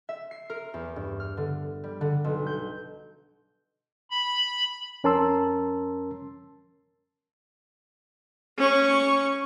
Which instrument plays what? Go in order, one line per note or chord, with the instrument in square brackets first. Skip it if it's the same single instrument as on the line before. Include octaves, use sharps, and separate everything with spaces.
[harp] E5
C7
A#4
E2
G2
F6
D3
G3
D3
B1
G6
[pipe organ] B5
[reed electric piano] F2 C#4 A#4 A5 C6 E6
[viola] C#4 C#6